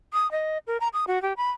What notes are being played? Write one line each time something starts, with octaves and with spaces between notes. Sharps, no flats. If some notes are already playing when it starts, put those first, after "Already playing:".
D#6
D#5
A#4
A#5
D#6
F#4
G4
B5